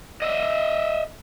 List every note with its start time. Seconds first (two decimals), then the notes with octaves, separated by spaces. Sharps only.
0.22 D#5 E5